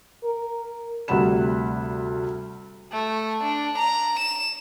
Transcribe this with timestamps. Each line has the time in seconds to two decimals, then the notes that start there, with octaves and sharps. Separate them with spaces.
0.24 A#4
1.08 D2 C3 G3 F#5 B5 E7
2.92 A3
3.44 D4
3.78 A#5
4.19 E7